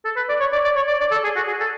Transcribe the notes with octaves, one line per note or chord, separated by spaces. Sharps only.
A4
B4
D5
C#5
D5
D5
C#5
D5
D5
A4
G#4
F#4
G#4
A4